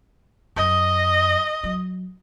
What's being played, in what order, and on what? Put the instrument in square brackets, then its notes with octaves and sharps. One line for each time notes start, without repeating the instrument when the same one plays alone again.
[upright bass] F#2 [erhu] D#5
[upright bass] F#3